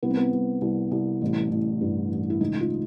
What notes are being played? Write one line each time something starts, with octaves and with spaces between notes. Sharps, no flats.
C2 B3
C4
B3
C2
C2
C2
A1
A1
G2
A1
E4
C#2 D#4
F4